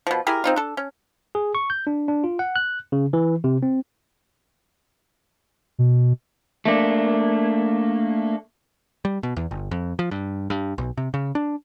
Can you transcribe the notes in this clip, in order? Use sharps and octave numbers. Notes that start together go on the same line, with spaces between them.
B2 F3
E4 G4 G#4 A#4
C4 D#4 F4
D4 A4
C#4
G#4
C#6
G6
D4
D4
F4
F#5
F#6
C#3
E3
C3
C4
B2
A3 A#3 D4
G3
B2
E2
G1
F2
F3
G2
G2
B1
C3
C#3
D4